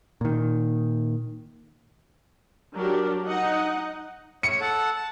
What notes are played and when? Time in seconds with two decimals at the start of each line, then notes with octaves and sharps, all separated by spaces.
0.21 A#2 D#3
2.77 F#3 D4 G4 A#4
3.28 D#4 D#5 F#5
4.43 C#5 C#7
4.61 A4 F#5 A5
4.96 A5